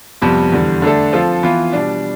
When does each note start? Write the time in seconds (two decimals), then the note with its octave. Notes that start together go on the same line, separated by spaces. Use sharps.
0.22 F2 C3 G3 B3
0.52 E2 D3 G3
0.82 D3 A3 D4 A4
1.13 F3 C4 F4 A4
1.43 E3 B3 F4
1.73 B2 G3 D4